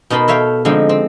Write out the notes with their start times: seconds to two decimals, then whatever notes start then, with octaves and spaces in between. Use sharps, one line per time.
0.10 B2 D#4 A#4 A5 B5 C6
0.28 A4 C#5 E5 F5 G5
0.65 D3 F3 G#3 C4 D#4
0.89 C4